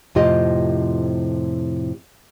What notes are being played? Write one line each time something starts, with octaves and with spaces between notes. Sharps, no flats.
F2 A2 C3 F4 G4 D#5